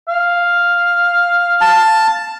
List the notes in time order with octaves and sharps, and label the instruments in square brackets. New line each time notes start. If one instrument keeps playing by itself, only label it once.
[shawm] F5
[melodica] A5